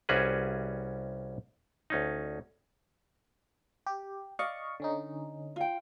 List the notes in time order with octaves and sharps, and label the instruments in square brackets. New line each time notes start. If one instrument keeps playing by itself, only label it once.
[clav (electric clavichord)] C2 G3 C#4 F#4 G#4 B4
D2 C#4 D#4
[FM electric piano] G4
[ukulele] D5 [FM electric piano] D#5 F5 C#6
[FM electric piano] D3 C#4 D#4
[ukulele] F4 G5